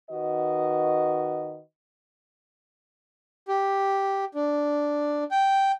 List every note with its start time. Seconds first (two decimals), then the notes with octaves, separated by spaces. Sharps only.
0.10 D#3 F#4 B4 D#5
3.48 G4
4.35 D4
5.31 G5